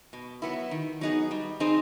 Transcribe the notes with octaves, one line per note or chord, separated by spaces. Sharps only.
B2
F#3 B3 E4
D#3
F#3 B3 D#4 G#4
G3
C4 D#4 G#4 C5